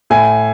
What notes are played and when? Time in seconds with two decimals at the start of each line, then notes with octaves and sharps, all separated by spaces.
0.10 A2 G#5